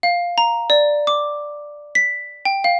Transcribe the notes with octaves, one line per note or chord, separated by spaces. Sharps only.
F5
A#5
D5
D6
B6
G5
F5